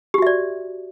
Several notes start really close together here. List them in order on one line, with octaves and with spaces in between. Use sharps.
G4 F#4 E5 D5